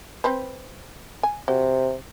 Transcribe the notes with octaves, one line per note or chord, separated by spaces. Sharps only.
C4 B4 C5
G#5
C3 F#4